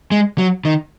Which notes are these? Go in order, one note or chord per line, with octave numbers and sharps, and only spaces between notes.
G#3
F#3
D#3